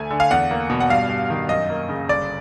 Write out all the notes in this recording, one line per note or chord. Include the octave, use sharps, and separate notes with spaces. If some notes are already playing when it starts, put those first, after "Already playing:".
Already playing: D2 A3 G#5
D3
F5
E2 F#5
A#3
B2
F#5
G2 F5
G2
D#3
F#2 D#5
A#3
C#3
G1 D5